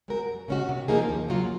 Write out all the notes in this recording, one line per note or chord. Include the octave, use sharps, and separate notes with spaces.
G#3 C4 F#4 A#4
F#2
C#3 G#3 C#4 F#4
C3
F3 A#3 D#4 G#4
D#2
C#3 F#3 A#3 F4